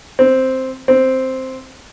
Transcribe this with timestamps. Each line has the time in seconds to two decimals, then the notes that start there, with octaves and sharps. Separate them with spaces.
0.19 C4
0.88 C4